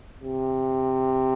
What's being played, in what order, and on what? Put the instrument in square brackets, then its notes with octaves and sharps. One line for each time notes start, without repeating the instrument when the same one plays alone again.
[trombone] C3